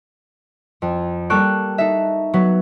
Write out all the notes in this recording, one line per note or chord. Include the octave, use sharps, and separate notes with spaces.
F2
G3 A#3 A4 C#6 F#6 D7
D#4 A4 E5
F#3 B3 B4